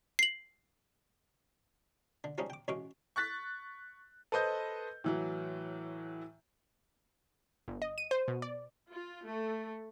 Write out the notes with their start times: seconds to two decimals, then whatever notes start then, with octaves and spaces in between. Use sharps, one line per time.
0.19 C7 F#7
2.24 D3
2.38 F3 G3 G#3 C#4 D#4
2.50 G5 D6
2.68 A1 F#2 G#3 C#4 C#6 D6
3.16 C#6 F#6 A6 B6
4.32 A4 B4 C5 D#5 G6
5.04 A2 E3 F#3
7.68 G1
7.82 D#5
7.98 D#7
8.11 C5
8.28 B2
8.42 D5
8.89 F4
9.25 A3